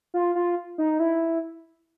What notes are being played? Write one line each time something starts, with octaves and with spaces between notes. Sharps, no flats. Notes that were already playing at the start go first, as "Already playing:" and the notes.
F4
F4
D#4
E4